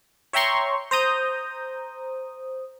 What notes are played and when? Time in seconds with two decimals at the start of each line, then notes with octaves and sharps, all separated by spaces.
0.33 C#5 E5 G5 A#5 C6 C#6
0.91 C5 A#5 D#6 G6